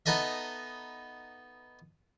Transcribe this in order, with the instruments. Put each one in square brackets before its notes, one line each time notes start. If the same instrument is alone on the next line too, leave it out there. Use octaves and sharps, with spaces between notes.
[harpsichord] B3 D#4 A4 D#5 E5